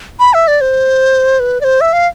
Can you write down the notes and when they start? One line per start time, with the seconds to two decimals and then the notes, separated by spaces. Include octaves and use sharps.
0.20 B5
0.34 E5
0.48 D5
0.61 C5
1.40 B4
1.61 D5
1.64 C5
1.81 E5
1.93 F5